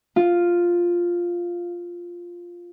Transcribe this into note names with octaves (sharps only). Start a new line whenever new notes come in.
F4